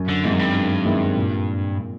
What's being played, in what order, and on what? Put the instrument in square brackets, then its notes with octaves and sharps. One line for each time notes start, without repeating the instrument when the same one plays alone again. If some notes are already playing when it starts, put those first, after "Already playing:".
Already playing: [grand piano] F#2
[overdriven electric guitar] D3
[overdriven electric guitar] G#2 [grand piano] D#3 G#3 C4 E4
[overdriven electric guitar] F#2
G2
[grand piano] F#2
D#3 G#3 C4 E4
A#2